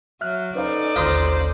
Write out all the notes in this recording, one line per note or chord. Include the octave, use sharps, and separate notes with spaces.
F#3 E5 F6 F#6
C#4 D#4 A4 B4 C5 D5 F5
A1 D#2 D3 D#4 F4 C5